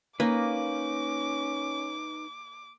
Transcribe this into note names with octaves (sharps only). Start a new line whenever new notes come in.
A#3 C#4 D#4 B4 D6